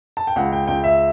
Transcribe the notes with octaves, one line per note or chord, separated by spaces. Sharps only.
A5
G5
C#2 F#5
G5
C#2 G5
E5